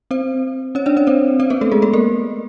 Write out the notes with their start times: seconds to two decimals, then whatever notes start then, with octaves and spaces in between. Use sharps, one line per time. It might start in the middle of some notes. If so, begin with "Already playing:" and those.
0.11 C4 C5
0.75 C#4 C#5
0.86 D4 D5
0.97 C#4 C#5
1.07 C4 C5
1.40 C4 C5
1.50 B3 B4
1.61 A3 A4
1.72 G#3 G#4
1.82 A3 A4
1.93 A#3 A#4